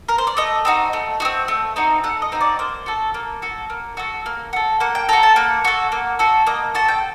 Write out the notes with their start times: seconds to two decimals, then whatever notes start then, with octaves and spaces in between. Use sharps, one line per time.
0.09 A#4
0.18 C5
0.27 D5
0.37 A3 D#5
0.65 C4 D#4 F#4
0.93 A3
1.20 D#4 F#4
1.25 C4
1.48 A3
1.76 C4 D#4 F#4
2.04 A3 F#5
2.22 D#5
2.32 C4 D#4 F#4
2.41 D5
2.59 A#3 C5
2.86 F#4 A4
3.14 A#3
3.42 F#4 A4
3.70 A#3
3.97 F#4 A4
4.26 A#3
4.53 F#4 A4
4.80 A#3 F#5
4.95 G5
5.09 F#4 A4 A#5
5.23 A5
5.36 A#3 F#5
5.65 F#4 A4
5.92 A#3
6.19 F#4 A4
6.47 A#3 D#5
6.75 F#4 A4 A5
6.88 G5